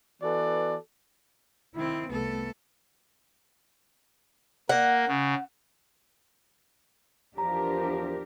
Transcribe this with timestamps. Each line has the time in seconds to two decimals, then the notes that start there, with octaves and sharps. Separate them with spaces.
0.22 E3 B3 F#4 A4 D5
1.75 D#3 C4 E4
2.10 C2 A3 B3 A4
4.69 A#3 F#5
5.08 C#3
7.38 E2 F3 D4 G4 A#4 A#5